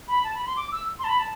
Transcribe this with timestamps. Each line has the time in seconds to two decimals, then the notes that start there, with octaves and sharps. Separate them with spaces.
0.08 B5
0.24 A5
0.35 B5
0.46 C6
0.57 D6
0.72 E6
0.99 C6
1.04 A5
1.09 B5
1.19 A5